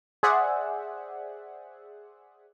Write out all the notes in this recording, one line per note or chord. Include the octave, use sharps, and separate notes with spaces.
G#4 C5 D5 E5 F#5